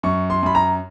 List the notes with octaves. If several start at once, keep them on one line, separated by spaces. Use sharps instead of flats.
F#2 C#6
C6
F#2 B5
A#5